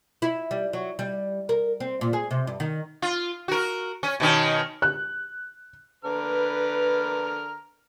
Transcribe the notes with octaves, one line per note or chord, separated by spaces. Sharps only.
E4
G3
F#3
G3
A#4
C4
A#2
G#4
C3
G2
D#3
F4
F#4 A#4
C#4
B2 D#3 C#4
F#6
D3 B4 A#5 F6